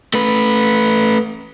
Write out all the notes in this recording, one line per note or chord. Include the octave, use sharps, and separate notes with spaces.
A3 B4